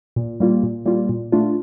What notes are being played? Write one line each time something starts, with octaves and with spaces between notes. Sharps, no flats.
A#2
G3 A#3 F4
A#2
G3 A#3 F4
A#2
A3 D4 F4